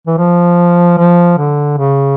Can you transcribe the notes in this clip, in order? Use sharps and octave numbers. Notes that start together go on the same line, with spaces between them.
E3
F3
F3
D3
C#3